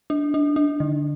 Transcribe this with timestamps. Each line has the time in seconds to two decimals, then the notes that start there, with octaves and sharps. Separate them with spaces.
0.10 D4
0.34 D4
0.56 D4
0.80 D3